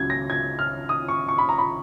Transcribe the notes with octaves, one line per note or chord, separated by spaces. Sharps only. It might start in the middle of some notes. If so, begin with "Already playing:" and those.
Already playing: C#2 C#3 F#3 G#6
A#6
G#6
F6
D#6
C#6
C#6
B5
A#5
B5